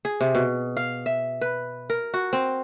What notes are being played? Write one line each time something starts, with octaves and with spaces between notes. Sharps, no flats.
G#4
C3
B2
F5
E5
B4
A#4
F#4
C4